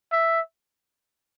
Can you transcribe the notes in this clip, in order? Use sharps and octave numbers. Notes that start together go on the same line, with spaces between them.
E5